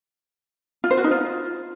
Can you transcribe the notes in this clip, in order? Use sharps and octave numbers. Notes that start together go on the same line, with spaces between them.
F4
C5
F#4
D#4
F4